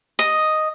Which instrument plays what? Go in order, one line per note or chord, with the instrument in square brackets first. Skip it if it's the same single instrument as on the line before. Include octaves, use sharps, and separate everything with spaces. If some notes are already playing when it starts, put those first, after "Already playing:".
[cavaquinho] D#5